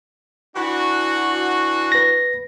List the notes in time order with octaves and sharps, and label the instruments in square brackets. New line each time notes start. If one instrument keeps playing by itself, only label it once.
[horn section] E3 D4 F#4
[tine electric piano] B4 A#6